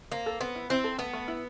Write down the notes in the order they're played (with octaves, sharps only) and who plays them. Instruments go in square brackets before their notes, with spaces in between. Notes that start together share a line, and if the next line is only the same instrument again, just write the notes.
[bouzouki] A#3 [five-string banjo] C4
[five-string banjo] A4
[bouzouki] B3 [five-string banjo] C4
[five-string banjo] E4
[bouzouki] C4 [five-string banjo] E4
[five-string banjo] A4
[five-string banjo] A3 [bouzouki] B3
[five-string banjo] A3
E4